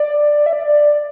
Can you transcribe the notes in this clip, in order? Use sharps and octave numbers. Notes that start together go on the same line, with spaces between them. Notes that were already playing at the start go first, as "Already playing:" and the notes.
Already playing: D5
E5
D5